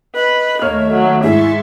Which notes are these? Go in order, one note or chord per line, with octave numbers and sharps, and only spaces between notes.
B4 D#5
D#2 A3 A#3 C#5 E5 F6
F#3
G#2 E4 G#4 E5 C6 C#6 A6